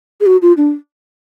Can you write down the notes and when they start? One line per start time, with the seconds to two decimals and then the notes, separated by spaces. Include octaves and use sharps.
0.21 G#4
0.26 F#4
0.42 F4
0.57 D4